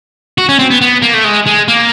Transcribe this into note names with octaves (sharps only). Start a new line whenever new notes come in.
F#4
C#4
C4
B3
B3
A#3
A3
G#3
G#3
A#3